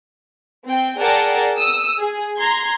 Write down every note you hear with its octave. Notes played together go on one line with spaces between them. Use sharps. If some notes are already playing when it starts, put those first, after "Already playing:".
C4 G5
G#4 A#4 D5 F#5 G5 A5
D#6 E6
G#4
A#5 C6 G#6